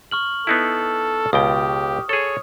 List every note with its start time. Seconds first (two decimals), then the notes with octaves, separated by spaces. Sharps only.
0.11 C#6 F6 F#7
0.47 B3 D#4 E4 A4
1.33 C#2 B2 G4 G5 D#6
2.09 G#4 A4 C#5